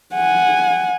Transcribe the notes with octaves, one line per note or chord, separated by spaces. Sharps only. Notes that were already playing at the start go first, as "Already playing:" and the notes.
F#5 G#5